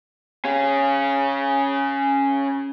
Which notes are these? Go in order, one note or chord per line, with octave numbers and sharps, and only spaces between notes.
C#4 G#4